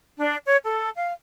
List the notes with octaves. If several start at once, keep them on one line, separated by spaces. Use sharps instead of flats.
D4
C#5
A4
F5